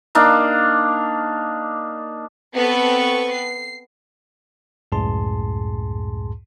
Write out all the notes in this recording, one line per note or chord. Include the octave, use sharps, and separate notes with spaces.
A#3 D4 D#4 F5
B3 C4 A4 B4 C#6
C7
C#2 F#2 A2 G#4 A5 C6